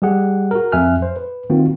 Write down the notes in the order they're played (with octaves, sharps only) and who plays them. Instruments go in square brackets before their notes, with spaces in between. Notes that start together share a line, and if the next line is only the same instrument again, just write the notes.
[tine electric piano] G3 G4 G#4 F#5
F#4 A#4
F2 E5 G#5 F6 F#6
C5
B4
D#3 A#3 C4 F4 F#4